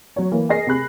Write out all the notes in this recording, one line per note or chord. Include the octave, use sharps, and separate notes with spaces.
F#3 C#5
E3 A#3
G#4 A#4 D#5 A#6 C7
C3 G#4 B5 F#6